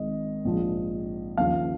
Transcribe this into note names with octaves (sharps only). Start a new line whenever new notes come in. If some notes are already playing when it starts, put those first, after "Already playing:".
Already playing: G#1 G#2 D#3 D#5
A#1 G#2 F3
D#2 C#3 F3 F5